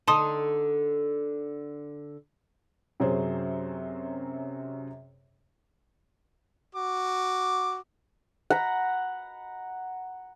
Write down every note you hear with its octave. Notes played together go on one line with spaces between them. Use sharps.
D3 D#4 A5 C6 D#6
F#2 C3 F#3 C#4 G#4 C5
F#4 D6
F#5 A#5 B5